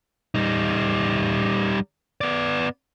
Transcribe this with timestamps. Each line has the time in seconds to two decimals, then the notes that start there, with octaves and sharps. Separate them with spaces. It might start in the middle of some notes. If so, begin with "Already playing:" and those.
0.35 G3 D#4
2.21 B3 D5